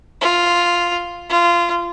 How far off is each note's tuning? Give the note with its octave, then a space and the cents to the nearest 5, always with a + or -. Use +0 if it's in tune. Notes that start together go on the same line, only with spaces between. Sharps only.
F4 +0
F4 -20